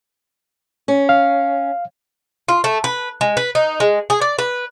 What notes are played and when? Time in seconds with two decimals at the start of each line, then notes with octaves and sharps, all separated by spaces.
0.88 C#4
1.09 F5
2.48 F4
2.64 A3
2.84 B4
3.21 G#3
3.37 B4
3.55 D#4
3.80 G#3
4.10 G#4
4.21 D5
4.39 B4